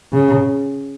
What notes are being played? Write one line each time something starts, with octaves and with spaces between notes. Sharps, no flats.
C#3